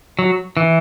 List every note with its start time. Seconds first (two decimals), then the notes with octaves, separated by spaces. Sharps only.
0.19 F#3
0.57 E3